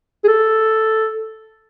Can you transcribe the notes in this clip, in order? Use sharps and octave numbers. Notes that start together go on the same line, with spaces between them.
G#4
A4